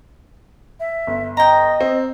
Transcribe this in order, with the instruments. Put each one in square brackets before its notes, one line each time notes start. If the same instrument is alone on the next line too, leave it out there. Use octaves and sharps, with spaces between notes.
[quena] E5
[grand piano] G1
[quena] D#5 [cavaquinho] G5 A#5
[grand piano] C4